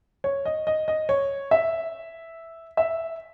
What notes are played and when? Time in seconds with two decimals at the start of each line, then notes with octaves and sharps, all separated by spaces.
0.24 C#5
0.45 D#5
0.67 D#5
0.88 D#5
1.09 C#5
1.51 E5
2.77 E5